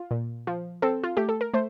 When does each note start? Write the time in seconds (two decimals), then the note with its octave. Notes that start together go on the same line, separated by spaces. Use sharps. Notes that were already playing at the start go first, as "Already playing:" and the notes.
Already playing: F4
0.11 A#2
0.47 F3
0.82 C4 A4
1.03 F4
1.17 A3 G4
1.29 A4
1.41 A#4
1.54 A3 C5